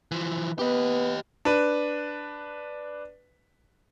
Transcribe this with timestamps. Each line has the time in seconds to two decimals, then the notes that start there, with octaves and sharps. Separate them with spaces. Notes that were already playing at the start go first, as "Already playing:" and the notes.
0.11 E3 F3
0.59 B3 G4 B4 D#5
1.45 D4 B4